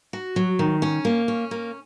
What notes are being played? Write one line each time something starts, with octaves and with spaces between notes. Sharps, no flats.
F#4
F#3
D#3
C#4
A#3
C#4
A#3